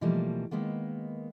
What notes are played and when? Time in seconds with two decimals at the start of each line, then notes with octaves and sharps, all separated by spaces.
0.01 B2 E3 F3 G3 A3 A#3
0.51 D#3 G#3 A#3 B3